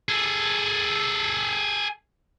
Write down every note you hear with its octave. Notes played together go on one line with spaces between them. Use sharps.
G#4 A4